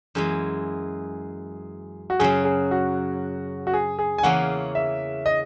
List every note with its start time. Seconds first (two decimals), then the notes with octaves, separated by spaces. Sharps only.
0.15 F#2 E3 G#3 G#4
2.10 F#4
2.20 F#2 C#3 F#3 G#4
2.45 G#4
2.71 F#4
3.67 F#4
3.73 G#4
3.99 G#4
4.18 G#5
4.23 E2 C#3 E3 A#3 C#4 F#5
4.75 E5
5.26 D#5